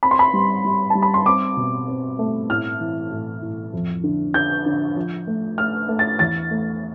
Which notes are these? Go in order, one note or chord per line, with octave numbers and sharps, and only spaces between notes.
C4 B5
C6
B5
G3
G3
G3 A5
B5
C6
C4 D6
B2
C4
A3
A2 F6
E3
A2
A2
F2
D3
D3 G6
D3
F3
A3
A3 F6
A3
A6
E2 A6
A3